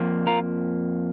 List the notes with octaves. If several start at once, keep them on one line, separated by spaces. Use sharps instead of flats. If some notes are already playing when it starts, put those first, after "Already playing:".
Already playing: F2 F3 A#3
F4 A#4